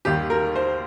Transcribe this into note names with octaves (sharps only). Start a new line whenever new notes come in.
D#2 D#3 G3 G4
A#4
C5